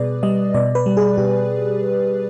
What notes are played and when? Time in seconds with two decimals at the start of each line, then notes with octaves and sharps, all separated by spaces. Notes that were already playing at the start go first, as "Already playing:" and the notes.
Already playing: B2 G3 G#4 B4 D5
0.23 G3 D#5
0.54 B2 D5
0.75 B4
0.86 G3
0.97 G#4
1.17 B2 G4